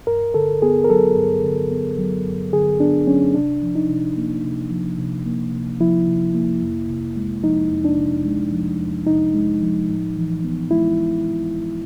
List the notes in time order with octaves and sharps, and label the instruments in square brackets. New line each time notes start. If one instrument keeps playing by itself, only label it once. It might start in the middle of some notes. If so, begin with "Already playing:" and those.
[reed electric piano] G2 A#4
D3 A4
B3 G#4
A#4
F#3 A4
G2
D3
B3
F#3
G2
D3 G#4
B3 D4
F#3 C#4
C3 D4
F3
D#4
C3
A#3
C3
F3
C3
A#3
C3
F3 E4
C3
A#3
F2
C3
G#3
F3 D#4
F2
D4
C3
G#3
F3
F2
C3 D#4
G#3
F3
A2
E3
B3
G#3 E4